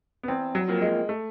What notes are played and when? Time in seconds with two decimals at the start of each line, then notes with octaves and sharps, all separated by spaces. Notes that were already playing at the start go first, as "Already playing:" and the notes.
0.23 B3
0.28 E2 C4
0.55 F#3
0.68 C3 F3 A#3
0.81 G#3
1.09 A3